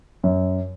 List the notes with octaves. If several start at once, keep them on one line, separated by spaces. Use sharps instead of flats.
F#2